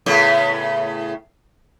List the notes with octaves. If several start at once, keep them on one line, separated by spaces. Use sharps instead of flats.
A2 C#3 B3